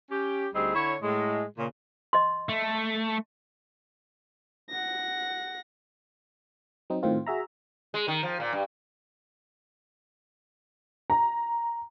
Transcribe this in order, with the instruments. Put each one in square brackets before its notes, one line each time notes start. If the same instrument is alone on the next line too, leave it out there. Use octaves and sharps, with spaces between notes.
[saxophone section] C#4 G4
D2 G3 C4 D#4 G#4
D3 E4 C#5
A2 G#3
A#2 C#3
[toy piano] D#5 C6
[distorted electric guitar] A3
[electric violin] F#5 A#6
[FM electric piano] F#3 C4 D#4
A2 D#3 C4 F4
F#4 G#4 E5 A#5
[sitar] G#3
D#3
F3
A#2
G2
[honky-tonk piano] A#5